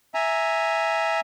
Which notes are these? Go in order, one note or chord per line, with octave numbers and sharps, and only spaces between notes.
E5 G#5 A#5